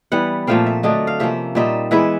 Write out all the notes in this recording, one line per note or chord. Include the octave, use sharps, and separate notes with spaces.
E3 G3 B3 F#5
A#2 F3 A3 C4 F5
E5
D3 F#3 A3 D#5
F5
C3 F3 A#3 C#4 E5
A#2 G3 C4 D#4 E5
E3 G#3 B3 E4 E5